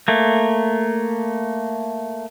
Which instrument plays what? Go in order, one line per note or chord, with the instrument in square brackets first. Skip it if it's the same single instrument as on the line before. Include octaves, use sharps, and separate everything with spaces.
[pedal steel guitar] A3 A#3